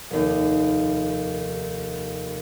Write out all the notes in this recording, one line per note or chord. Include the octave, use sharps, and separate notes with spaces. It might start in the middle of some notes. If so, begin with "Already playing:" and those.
F1 D#2